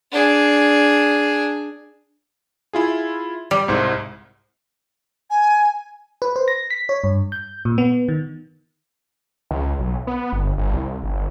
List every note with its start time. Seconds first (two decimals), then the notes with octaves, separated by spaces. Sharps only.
0.12 D4 G#4
2.73 E4 F4 G#4
3.51 G3 G4
3.68 C2 G#2 C5
5.30 G#5
6.22 B4
6.36 C5
6.48 A#6
6.70 B6
6.89 C#5
7.04 G2
7.32 G6
7.65 A#2
7.78 B3
8.08 D#3
9.51 C#2
9.79 B1
10.07 B3
10.32 G1
10.58 G1
10.73 C2
11.03 G1